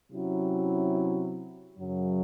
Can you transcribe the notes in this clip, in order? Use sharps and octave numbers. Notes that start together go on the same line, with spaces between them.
C3 F#3 C#4 E4
F#2 C#3 F#3